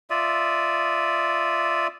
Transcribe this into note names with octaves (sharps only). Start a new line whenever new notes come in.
F4 D5 E5 D#6